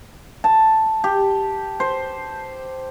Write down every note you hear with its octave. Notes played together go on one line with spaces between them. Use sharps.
A5
G4
C5